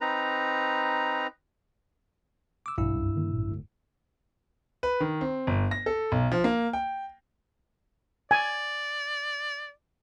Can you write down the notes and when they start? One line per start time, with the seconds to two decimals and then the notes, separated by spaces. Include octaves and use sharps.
0.01 C4 D#4 B4 A#5
2.66 D6 E6
2.78 A#1 G2 B2 E4 E6
2.94 C2 F#2
3.16 D3 D#3 A#3
3.32 A1 A#2
3.49 D1 D2
4.83 B4
5.00 D#3
5.21 C4
5.47 G1
5.71 A#6
5.86 A4
6.12 B1
6.32 F3
6.44 A#3
6.73 G5
8.31 D5 G#5